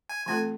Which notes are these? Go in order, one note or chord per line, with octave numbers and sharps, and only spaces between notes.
G#5
E3 A3 C4 F4 A4 G#5